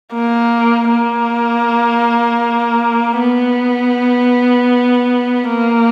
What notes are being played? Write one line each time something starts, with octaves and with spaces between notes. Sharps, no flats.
A#3
A#3
B3
A#3